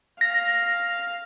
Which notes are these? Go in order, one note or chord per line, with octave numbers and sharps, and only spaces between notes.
F5 A#6